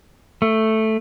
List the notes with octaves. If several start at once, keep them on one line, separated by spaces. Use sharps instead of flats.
A3